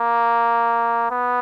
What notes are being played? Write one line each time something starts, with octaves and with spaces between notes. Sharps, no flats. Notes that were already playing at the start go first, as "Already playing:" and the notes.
Already playing: A#3
B3